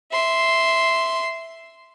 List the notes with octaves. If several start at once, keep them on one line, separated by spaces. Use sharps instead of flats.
E5 C6